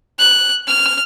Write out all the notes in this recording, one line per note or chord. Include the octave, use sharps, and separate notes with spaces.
F#6
F6